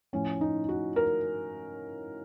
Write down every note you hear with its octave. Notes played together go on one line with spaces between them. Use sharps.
A2 F3 C#4
D#4
F#4
A#4